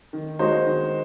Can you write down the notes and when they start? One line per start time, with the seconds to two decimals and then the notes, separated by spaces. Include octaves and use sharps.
0.13 D#3
0.39 G#3 D#4 F#4 C5
0.66 D#3